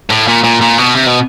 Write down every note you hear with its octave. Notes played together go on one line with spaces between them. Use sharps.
A2
A#2
A#2
A#2
B2
C3
B2